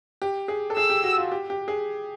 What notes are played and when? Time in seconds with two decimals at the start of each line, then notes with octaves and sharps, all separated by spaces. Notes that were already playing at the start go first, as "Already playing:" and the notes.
0.22 G4
0.48 G#4
0.70 A4
0.76 G#4 E6
0.90 G4
1.04 F#4
1.17 F4
1.32 G4
1.50 G4
1.68 G#4